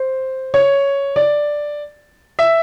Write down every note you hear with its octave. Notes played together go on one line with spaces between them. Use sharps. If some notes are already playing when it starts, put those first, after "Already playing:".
Already playing: C5
C#5
D5
E5